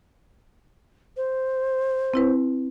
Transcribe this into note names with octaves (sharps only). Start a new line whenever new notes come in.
C5
C4 E4 B4